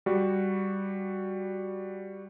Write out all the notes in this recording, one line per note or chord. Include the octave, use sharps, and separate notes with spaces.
G3 F#4